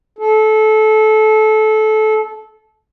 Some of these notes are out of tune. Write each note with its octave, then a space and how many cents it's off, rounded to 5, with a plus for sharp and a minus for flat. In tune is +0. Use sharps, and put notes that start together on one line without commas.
A4 -20